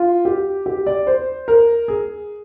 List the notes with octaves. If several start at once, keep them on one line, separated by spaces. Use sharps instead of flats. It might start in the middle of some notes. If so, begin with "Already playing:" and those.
Already playing: F4
G4
G4
D5
C5
A#4
G#4